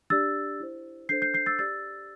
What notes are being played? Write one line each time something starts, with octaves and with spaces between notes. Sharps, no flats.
D4 G4 D5 E6 A6
E4 C5
D4 A4 C5 G6 C7
G6 C7
G6 C7
E6 A6
G4 D5 E6 A6